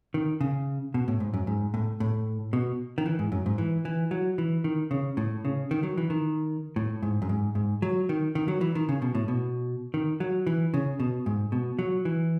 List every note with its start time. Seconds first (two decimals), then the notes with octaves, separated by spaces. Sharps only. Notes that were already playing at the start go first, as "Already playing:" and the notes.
0.14 D#3
0.41 C#3
0.94 B2
1.08 A2
1.20 G#2
1.34 F#2
1.47 G#2
1.74 A2
2.00 A2
2.53 B2
2.98 D#3
3.06 E3
3.19 G#2
3.32 F#2
3.46 G#2
3.58 E3
3.85 E3
4.11 F#3
4.38 E3
4.64 D#3
4.91 C#3
5.17 A2
5.45 C#3
5.71 D#3
5.83 F#3
5.98 E3
6.10 D#3
6.76 A2
7.03 G#2
7.22 F#2
7.29 G#2
7.55 G#2
7.82 F#3
8.09 D#3
8.35 D#3
8.48 F#3
8.61 E3
8.75 D#3
8.89 C#3
9.02 B2
9.15 A2
9.28 B2
9.94 D#3
10.20 F#3
10.47 E3
10.74 C#3
11.00 B2
11.26 G#2
11.52 B2
11.79 F#3
12.05 E3